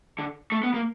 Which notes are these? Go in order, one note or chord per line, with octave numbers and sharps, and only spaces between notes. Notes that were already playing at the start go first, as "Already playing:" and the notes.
D3
A3
B3
A#3